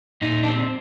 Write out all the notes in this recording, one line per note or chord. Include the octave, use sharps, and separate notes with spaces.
A#2 D#4
D4
C4